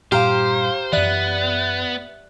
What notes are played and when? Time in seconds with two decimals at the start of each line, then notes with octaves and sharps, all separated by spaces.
0.12 G2 A#2 G4 C5 F5 A#5 F6
0.93 F#2 E3 B3 D5 E5 F#6